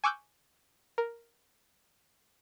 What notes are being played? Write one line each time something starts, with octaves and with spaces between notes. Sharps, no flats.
G#5 C#6 D6 E6 F#6 G6
A#4